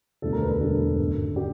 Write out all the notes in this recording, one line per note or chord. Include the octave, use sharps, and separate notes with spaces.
E1 D2 D3 G3 B3 A4
A#4
B4
A#4
E1 D2 D3 G3 B3 A4
G#1 F#2 D3
D3 G4